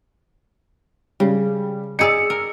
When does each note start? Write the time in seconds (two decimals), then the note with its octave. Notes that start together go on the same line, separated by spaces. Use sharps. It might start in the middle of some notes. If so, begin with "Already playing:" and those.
1.20 C#3 G3
1.99 D#4 G#4 D5 E6 C#7
2.30 A#4